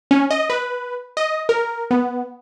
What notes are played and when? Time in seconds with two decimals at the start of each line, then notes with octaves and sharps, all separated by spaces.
0.11 C#4
0.31 D#5
0.50 B4
1.17 D#5
1.49 A#4
1.91 B3